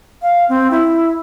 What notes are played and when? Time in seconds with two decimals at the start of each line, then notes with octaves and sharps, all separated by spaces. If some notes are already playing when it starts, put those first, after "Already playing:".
0.22 F5
0.49 C4
0.71 E4